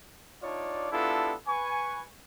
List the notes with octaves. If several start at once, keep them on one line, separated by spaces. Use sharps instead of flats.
D4 D#4 F4 C#5 D5
B3 D4 E4 F4 G4 A4
B4 G#5 C#6